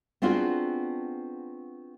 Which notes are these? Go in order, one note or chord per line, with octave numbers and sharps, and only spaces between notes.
B3 C4 D4 F4 F#4 G#4